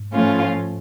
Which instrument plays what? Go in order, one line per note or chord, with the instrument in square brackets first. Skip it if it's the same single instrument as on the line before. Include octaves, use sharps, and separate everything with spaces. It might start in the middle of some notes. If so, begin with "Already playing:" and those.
Already playing: [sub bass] G#2
[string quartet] A2 F3 A3 C#4 F4